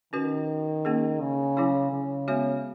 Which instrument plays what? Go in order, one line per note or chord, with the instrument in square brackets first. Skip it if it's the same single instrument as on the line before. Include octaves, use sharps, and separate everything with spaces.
[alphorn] D#3 [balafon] C#4 F#4 B4
[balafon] A#3 C#4 G#4
[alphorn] C#3
[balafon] F#3 C#4 E4 G#4
[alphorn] C#3
[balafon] G#3 B3 F#4 C#5